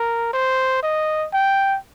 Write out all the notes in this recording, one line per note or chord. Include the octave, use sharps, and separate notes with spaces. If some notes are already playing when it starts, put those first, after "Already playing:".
Already playing: A#4
C5
D#5
G5